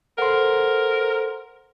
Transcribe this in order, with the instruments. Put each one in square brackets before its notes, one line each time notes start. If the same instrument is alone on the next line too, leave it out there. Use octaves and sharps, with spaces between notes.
[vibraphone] A4 C5 [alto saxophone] A#4 [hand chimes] F#5 C6